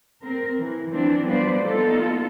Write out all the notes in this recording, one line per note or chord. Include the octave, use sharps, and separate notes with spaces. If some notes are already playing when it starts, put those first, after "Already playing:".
C4 A#4
E3
E3 F3 C4 D4
F3 G3 B3 B4 C5 D5
A#3 B3 D#4 F4 A4